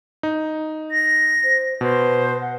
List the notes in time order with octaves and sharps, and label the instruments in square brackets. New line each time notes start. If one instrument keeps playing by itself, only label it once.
[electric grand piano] D#4
[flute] A#6
[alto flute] C5
[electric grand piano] B2 [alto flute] B4 [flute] C5
[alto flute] F#5